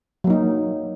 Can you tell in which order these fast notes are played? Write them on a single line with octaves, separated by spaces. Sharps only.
F#3 A#3 D#4